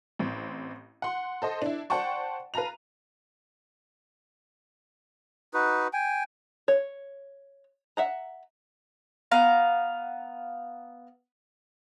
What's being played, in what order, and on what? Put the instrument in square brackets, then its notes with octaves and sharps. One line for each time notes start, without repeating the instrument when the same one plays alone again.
[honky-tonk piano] A1 C4
F#5 C6
A4 C5 D#5
D4 E4
C5 D5 F#5 G5 A5 C#6
B4 F5 A5 A#5 F7
[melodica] D#4 F#4 B4
G5 G#5
[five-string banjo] C#5
E5 F#5 A#5
[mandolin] B3 F5 A#5